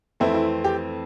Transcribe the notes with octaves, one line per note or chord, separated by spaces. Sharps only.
F2 E3 A3 C4 E4
E4
G4